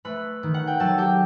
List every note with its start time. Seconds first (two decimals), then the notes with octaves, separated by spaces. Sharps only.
0.05 A3 B4 B5
0.43 D#3
0.54 F#5
0.67 G5
0.80 F#3 A4 A5
0.98 G4 G5